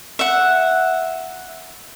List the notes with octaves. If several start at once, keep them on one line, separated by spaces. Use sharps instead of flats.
E5 F#5